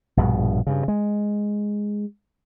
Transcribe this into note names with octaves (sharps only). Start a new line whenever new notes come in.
A#1 G2 B2
G2 C#3
G#3